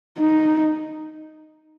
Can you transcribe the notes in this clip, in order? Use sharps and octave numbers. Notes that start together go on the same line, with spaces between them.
D#4